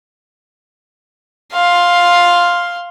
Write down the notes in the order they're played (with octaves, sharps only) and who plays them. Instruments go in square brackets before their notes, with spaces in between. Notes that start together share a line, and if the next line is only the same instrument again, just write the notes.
[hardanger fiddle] F5 C6